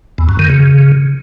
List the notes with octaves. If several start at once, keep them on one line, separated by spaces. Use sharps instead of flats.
E2
F#2
D#3
C#3